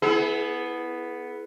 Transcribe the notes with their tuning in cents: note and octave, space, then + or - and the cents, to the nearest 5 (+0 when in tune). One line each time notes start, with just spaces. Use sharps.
B3 +0 E4 +0 G#4 +40